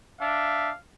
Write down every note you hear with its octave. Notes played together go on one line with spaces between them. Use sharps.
D4 E5 F5